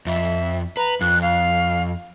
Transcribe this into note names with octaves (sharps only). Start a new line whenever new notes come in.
F2 E5
B4 A#5
F2 F#6
F5